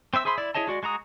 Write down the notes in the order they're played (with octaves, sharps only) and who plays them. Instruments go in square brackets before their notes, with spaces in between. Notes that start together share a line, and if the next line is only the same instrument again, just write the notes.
[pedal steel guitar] C4 C5 E5 E6
G#4 C5 E5 B5 C6
E4 D5
E4 G#4 C#5 D#5 A5
G#3 F#4 D5
G#3 F#4 A#5 D#6